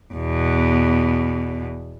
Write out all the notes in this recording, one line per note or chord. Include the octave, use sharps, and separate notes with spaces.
E2 B2